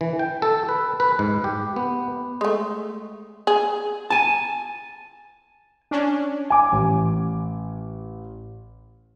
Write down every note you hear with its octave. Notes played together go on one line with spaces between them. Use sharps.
E3
G5
A4
B4
B4
G#2
G4
B3
G#3 A3
G#4
G#5 A5
C#4 D4
G#5 D6
A1